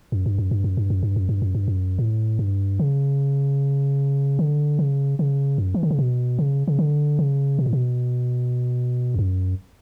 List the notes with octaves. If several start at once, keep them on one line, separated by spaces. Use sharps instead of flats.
F#2
G2
F#2
G2
F#2
G2
F#2
G2
F#2
G2
F#2
G2
F#2
A2
G2
C#3
D3
C#3
C#3
F#2
E3
D3
C#3
B2
C#3
C#3
D3
C#3
B2
A2
B2
E2
F#2